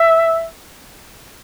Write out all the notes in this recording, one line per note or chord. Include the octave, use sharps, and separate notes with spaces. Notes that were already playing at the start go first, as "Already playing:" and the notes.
Already playing: E5